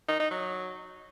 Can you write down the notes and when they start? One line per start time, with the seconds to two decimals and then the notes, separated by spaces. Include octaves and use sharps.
0.08 D#4
0.19 D#4
0.31 F#3